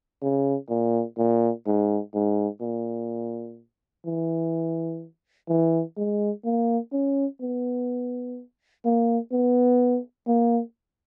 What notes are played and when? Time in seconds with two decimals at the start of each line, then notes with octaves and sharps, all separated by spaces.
0.22 C#3
0.70 A#2
1.18 A#2
1.66 G#2
2.14 G#2
2.61 A#2
4.06 E3
5.49 E3
5.97 G#3
6.45 A#3
6.92 C#4
7.41 B3
8.85 A#3
9.32 B3
10.27 A#3